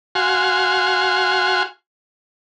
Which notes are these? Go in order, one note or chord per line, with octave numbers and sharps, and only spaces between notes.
F#4 F5 G#5 C6